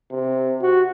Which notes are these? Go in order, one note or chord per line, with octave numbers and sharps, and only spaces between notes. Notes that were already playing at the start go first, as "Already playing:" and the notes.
C3
F#4